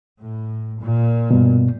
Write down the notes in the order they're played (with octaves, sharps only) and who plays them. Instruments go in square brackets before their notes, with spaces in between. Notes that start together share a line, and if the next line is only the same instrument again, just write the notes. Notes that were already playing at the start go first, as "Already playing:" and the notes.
[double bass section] A2
A#2
[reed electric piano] G2 B2